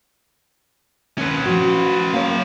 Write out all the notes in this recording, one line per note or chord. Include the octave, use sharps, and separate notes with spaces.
D#2 C#4 B4
F3 F#4
F#3 A#3 A#4 C#5 F5